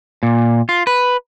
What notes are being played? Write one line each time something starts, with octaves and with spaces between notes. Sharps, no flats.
A#2
F4
B4